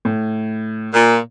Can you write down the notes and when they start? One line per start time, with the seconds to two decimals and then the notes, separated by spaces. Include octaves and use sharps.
0.05 A2
0.94 A#2